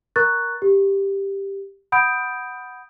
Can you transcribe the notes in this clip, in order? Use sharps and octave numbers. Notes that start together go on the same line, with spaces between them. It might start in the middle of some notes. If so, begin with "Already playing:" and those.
A#4 A#5 C#6 F#6 A6
G4
F#5 B5 D#6 G6 D7